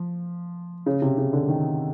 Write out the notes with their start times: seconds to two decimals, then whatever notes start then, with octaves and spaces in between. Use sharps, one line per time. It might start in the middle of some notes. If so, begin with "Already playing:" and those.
Already playing: F3
0.86 C#3
1.02 C3
1.18 C#3
1.33 D3
1.48 D#3